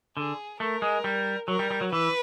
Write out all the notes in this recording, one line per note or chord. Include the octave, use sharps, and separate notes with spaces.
D3 G#4
A3 A#4
G#3
G3
F#3 A#4
G3
G3
F#3
E3 B4